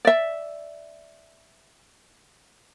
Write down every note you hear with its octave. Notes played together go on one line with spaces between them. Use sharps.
D5 E5